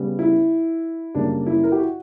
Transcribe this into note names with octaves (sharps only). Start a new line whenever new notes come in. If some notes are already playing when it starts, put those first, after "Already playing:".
Already playing: C#3 G3 B3
E4
F#2 C#3 G3 A#3 D4
E4
A#4
G4
F#4